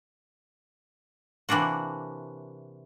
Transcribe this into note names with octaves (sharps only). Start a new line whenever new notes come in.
C3 E3 A#3 D4 F#4